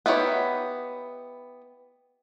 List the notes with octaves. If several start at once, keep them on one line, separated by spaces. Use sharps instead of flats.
B3 D#4 E4 G4 C#5